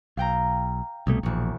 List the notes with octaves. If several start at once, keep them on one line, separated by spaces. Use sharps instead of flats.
B1 F5 G5 A#5
C2 B2 A3
E1 A#1 C#6